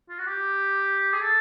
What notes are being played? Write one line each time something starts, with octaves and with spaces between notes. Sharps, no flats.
F4
F#4
G4
G#4
A4